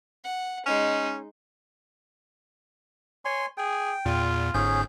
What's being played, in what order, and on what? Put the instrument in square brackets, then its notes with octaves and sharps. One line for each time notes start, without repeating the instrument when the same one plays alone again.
[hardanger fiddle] F#5
[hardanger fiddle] G#3 D#4 [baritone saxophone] C#4
[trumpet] C#5 [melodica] G#5 C6
[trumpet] G#4 [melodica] G5
[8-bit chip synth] E2 A#2 [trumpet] F4
[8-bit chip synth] G1 G#2 G6 [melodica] C#4 G#4